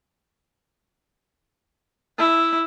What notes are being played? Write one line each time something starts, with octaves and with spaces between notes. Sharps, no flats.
E4